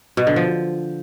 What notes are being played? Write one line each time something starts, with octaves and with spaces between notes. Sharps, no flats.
B2
D3
F3